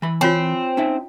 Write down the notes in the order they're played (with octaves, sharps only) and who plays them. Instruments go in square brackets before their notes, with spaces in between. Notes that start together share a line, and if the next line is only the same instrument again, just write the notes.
[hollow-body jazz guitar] E3 B5
[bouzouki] C4 [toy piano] F4 C#5 G#5
[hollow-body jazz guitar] C#4 D#4 E5